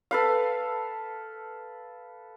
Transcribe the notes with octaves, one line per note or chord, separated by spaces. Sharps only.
A4 B4 F5